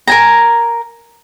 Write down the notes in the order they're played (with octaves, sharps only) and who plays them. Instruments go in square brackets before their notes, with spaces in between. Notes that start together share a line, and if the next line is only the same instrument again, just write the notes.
[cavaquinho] A#4 G#5 A#5